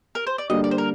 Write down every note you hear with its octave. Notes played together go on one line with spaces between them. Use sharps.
A#4
C5
D5
D3 G3 A#3 D4 G4 D#5
D5
C5
A#4